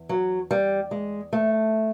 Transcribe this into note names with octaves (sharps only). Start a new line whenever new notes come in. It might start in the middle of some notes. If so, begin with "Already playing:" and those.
Already playing: E2
F#3
G3
G#3
A3